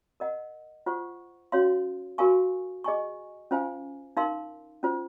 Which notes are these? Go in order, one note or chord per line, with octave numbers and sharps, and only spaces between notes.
A#4 D#5 F#5
F4 C5 F#5 C#6
C#4 F#4 C#5 F5 C6
F#4 A#4 F5 G#5 C#6
G#4 D#5 G#5 C#6
C#4 F4 C5 F5 G#5
D#4 A#4 F5 C6
C#4 F4 C5